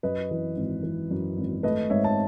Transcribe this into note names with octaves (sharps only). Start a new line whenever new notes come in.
F#2 B4 D#5
E3
G#1
E3
F#2
G#1
A3 B4 D#5
G#2 C#5 E5
A5